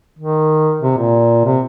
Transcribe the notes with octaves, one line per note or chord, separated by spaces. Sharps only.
D#3
C3
A#2
C3